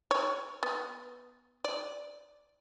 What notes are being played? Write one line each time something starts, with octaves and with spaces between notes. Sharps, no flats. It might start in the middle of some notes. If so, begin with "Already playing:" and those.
C#5
B3
D5